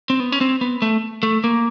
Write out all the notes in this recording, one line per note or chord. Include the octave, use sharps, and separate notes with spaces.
C4
B3
C#4
C4
B3
A3
A3
A#3